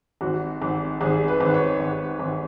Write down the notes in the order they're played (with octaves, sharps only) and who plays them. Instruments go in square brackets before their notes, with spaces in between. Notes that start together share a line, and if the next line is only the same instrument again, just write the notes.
[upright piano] G#1 F#4
G#1
G#1 G#4
B4
G#1
C#5
G#1
G#1